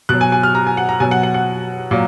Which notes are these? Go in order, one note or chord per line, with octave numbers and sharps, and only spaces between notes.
B2 F#3 F#6
G#5
G#5
F6
A#5
G#5
F#5
A#5
B2 F#3 G#5
F#5
F#5
F#5
A#2 F#3